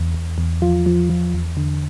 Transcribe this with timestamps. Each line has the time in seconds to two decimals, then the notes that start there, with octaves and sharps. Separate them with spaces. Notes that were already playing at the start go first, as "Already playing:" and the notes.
Already playing: E2
0.14 E2
0.38 E2
0.62 F3 F4
0.86 F3
1.10 F3
1.34 E2
1.57 D3